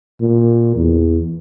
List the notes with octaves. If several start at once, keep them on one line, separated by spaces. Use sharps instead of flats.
A#2
E2